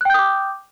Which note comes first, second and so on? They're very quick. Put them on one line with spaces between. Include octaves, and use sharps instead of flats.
F#6 G5 G6 D#6 D6